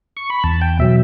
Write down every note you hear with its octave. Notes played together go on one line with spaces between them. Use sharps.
C#6
B5
E2 A5
G5
B2 F#3 E5